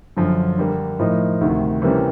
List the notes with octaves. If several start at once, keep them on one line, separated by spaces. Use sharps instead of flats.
F#2 D3 F3
D3 G3 A#3
A2 F3 A#3 D#4
D2 C3 D#3
C3 E3 G3 A#3 C#4